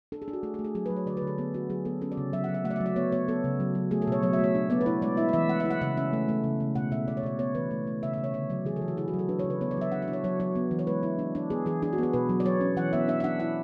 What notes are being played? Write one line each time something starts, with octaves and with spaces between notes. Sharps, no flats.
D4 A4
G#4
D4
F#4
A3 G#4
G#4
A3
G#4
F#3 G#4
B4
F#3
C#5
D3 D5
B4
D3
A4
B3 G#4
D4 F#4
F#3 G#4
B3 A4
C#4 A4
D5
C#3
F#3 E5
F#5
F#3
E5
A3 F#5
D5
E5
F#3
D5
B3 C#5
B3 C#5
B3 A4
C#3
F#3
F#3
A3 G#4
A4
B2 C#5
F#3 C#5
E5
A3 C#5
D4
B3 D5
B4
E4 C#5
G#3 D5
E4 E5
D5
E3 E5
G#3 F#5
E5
E4
F#5
C#3 E5
C#4 E5
A3
A3
C#3
C#3
B2 F#5
B2 E5
B2 D5
C#5
B2 D5
B3 C#5
E3 B4
A3
A3
C#3 E5
C#3 E5
C#5
D3 C#5
F#3 D5
E3 G#4
A4
E3
F#4
E4 G#4
F#4
F#3
A4
D4 B4
C#5
C#3
B4
B3 C#5
D5
F#3 E5
D4 F#5
E5
D4
C#5
F#3 C#5
F#3 C#5
B3
E3
C#5
G#3 B4
E4
D4
D4
B3 G#4
E3 G#4
D4 G#4
F#4
B3
G#4
B2 B4
F#3
D5
F#3 C#5
C#4
E3 F#5
B3 E5
D4 E5
E5
D4 F#5
E4 F#5